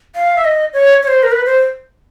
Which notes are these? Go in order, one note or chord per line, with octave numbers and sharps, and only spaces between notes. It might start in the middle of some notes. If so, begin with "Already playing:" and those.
F5
E5
D#5
C#5
C#5
C5
A#4
B4
C5